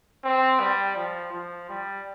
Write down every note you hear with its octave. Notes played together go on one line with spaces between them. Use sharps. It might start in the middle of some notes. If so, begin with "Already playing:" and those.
C4
G3
F3
F3
G3